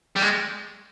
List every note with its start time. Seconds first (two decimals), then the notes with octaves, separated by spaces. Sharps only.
0.16 G3
0.22 G#3